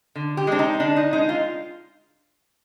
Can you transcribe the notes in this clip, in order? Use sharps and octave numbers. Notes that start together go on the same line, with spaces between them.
D3
G4
G#3 C4 D4
D#4
D3 D4
D#4
G#3 C4 D#4
F4